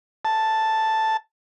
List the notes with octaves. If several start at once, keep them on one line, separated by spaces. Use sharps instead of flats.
A5